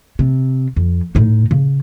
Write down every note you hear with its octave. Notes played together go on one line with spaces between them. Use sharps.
C3
F2
A2 D#4
C#3